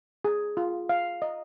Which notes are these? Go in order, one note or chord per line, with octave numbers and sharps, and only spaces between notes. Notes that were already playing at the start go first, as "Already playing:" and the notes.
G#4
F4
F5
D#5